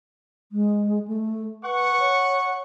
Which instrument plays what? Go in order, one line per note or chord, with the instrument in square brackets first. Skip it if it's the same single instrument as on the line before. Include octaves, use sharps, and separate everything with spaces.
[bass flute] G#3
A3
[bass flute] B4 [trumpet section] F#5 C#6
[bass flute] C#5